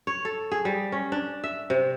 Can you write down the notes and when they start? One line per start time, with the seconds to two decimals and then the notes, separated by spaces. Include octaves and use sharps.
0.07 C#5
0.25 A4
0.52 G#4
0.65 G3
0.92 C#4
1.12 D4
1.44 E5
1.70 C3